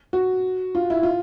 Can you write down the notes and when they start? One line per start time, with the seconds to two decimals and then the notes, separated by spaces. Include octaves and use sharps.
0.13 F#4
0.75 F4
0.90 E4
1.03 F4